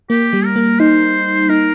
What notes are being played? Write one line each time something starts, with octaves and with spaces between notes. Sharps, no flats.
A#3 G4
G3
A#4
A#3
D#4 C5
D#4 A#4